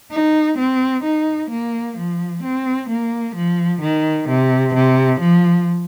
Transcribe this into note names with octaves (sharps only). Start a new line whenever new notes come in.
D#4
C4
D#4
A#3
F3
C4
A#3
F3
D#3
C3
C3
F3